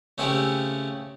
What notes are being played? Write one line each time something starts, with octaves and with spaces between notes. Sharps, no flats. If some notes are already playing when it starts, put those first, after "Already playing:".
C#3 A3 C4 C#4 E4 G4